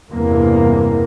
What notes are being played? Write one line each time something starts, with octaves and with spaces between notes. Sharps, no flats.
E2 G2 C3 A#3